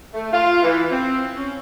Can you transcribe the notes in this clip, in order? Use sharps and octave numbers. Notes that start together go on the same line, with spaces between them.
A3
F4
E3
C4
C#4